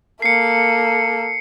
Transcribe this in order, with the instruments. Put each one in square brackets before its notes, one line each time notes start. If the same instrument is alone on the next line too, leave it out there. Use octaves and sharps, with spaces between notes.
[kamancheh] A#3 A4 [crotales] C7 C#7